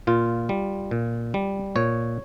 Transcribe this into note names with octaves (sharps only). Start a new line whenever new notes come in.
A#2 F4
G3
A#2
G3
A#2 C#5